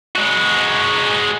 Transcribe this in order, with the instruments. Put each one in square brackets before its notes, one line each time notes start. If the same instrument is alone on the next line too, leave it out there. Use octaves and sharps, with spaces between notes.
[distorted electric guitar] G#3 F#4